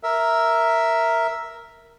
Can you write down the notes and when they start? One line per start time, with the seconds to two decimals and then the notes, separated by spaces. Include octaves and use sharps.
0.03 A#4 E5